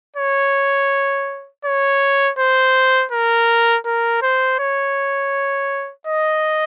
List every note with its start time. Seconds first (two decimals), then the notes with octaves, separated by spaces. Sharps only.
0.16 C#5
1.65 C#5
2.39 C5
3.11 A#4
3.86 A#4
4.22 C5
4.59 C#5
6.07 D#5